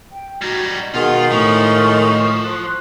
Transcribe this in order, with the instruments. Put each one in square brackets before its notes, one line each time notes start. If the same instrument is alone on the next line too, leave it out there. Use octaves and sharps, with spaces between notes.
[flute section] G5
[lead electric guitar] G3 D#4 [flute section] F#4 G#6
[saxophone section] G#2 D#3 [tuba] B2 [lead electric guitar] F4 [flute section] G#4 F#5
[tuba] A2 [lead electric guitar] F3 [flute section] C#6
[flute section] C6 F#6